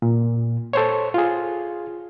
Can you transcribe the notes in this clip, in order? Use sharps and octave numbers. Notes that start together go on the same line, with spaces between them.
A#2
A4 C5 C#5
F4 G#4